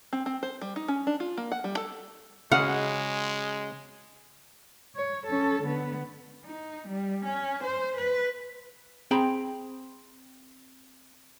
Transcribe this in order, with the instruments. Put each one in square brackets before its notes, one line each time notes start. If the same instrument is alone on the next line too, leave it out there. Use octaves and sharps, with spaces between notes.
[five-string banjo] C4
C4
C5
G3
D#4
C#4
D4
F4
A#3
F#5
G3
A4
[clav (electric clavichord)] C#3 F#4 D#5 [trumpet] G#3 [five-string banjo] F5 [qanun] F#5
[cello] C#5
C#4 A4
D3 B3
D#4
G3
C#4
C5
B4
[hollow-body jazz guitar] C4 G#4 G5 A#5 B5